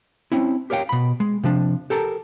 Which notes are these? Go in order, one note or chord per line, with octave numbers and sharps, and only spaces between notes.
C4 C#4 E4
G4 A#4 C#5 F5 G5
B2 B5
G#3
C3 F3 D4
G4 A4 A#4 A5